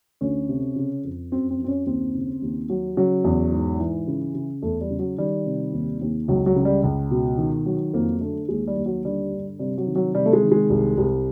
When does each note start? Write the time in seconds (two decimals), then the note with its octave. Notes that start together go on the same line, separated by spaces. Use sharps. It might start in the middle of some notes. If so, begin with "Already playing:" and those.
0.21 D2 C#4
0.49 C3
0.76 C#3
1.04 F2
1.32 F#2 C4
1.50 C4
1.59 F#2
1.64 C4
1.68 C#4
1.86 D#2 C4
2.15 C#3
2.42 D#2
2.70 F#3
2.97 C#3 F#3
3.24 E2
3.52 G#2
3.80 E3
4.07 C#3
4.35 C#3
4.62 E2 A3
4.81 G3
4.90 C#3
4.99 F#3
5.18 D#3 G3
5.46 C3
5.73 D#2
6.01 D#2
6.28 C#2 F#3
6.46 F#3
6.56 C#3
6.65 G3
6.83 C#2
7.11 B2
7.38 D#3
7.66 F#3
7.93 F2 A#3
8.21 D3 A3
8.49 D#2 G#3
8.67 G3
8.76 D#2
8.86 F#3
9.05 D3 G3
9.32 G2
9.59 C3 G3
9.78 F#3
9.87 D#3
9.96 F#3
10.15 C3 G3
10.26 A3
10.33 G#3
10.42 D#3
10.52 G#3
10.70 C2
10.97 C2